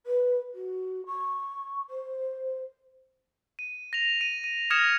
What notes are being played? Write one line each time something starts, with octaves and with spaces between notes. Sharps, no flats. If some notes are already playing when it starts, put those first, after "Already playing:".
B4
F#4
C#6
C5
D#7
A#6 F7
D#7
D#7
D#6 F6 G#6 A#6 C#7 E7